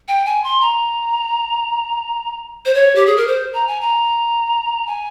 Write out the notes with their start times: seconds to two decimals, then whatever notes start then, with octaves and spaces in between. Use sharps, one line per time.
0.08 G5
0.26 G#5
0.44 C6
0.61 A#5
2.66 C5
2.74 C#5
2.96 G4
3.06 G#4
3.17 A#4
3.27 C5
3.54 A#5
3.68 G#5
3.81 A#5
4.87 G#5